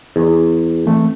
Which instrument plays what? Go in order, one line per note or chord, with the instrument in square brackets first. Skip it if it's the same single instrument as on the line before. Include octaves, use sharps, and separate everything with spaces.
[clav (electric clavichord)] E2
[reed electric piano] E3 A3 C4